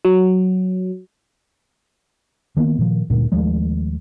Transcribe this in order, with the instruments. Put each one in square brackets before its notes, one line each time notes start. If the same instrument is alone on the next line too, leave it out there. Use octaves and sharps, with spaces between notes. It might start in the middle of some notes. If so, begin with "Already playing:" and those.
[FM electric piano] F#3
[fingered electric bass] D#3 A#3 B3
A#2 D#3 F3
D2 G2 A#2
D#2 F3 G#3 A3